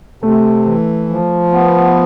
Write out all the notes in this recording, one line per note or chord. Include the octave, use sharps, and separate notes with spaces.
C3 A3
E3
F3
B3